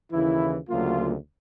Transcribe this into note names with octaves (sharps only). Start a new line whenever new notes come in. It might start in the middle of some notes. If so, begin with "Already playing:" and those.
D#2 C#3 E3 E4
D2 C#3 F#3 A#3 F4